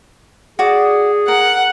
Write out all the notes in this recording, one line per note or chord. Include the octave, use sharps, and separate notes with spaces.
F#4 G#4 D5
A#4 F#5